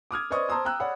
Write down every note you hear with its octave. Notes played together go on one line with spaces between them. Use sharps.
D6 D#6 F6 G#6
B4 C5 D5 D#5 C#6 D#6
C5 A5 A#5 C6 D#6 E6
G5 A#5 E6 F#6
C#5 D5 F#5 B5